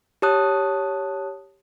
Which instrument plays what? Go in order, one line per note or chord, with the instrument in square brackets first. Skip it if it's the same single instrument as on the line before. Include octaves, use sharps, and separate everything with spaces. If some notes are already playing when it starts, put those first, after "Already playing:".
[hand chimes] G4 C#5 A5 D#6 F#6